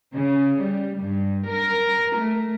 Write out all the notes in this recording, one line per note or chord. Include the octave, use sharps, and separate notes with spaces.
C#3
G3
G2
A#4
A3